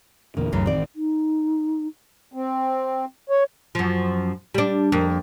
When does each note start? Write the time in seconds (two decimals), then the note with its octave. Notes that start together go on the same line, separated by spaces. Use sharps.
0.37 E2 A#2 D3 A#3
0.53 C2 F#2 A2 C#3 E3
0.66 A1 D#3 C4 D5
0.96 D#4
2.33 C4
3.30 C#5
3.75 F#2 F3
4.54 G3 D4
4.92 F2 A#3